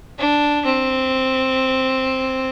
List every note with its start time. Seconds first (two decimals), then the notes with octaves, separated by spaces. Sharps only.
0.19 D4
0.65 C4